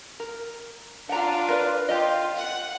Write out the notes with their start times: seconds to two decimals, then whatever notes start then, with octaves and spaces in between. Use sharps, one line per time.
0.20 A#4
1.09 D4 F4 F#5 A#5
1.49 A#4 B4 D5
1.89 F4 G4 A#4 D#5
2.37 F#5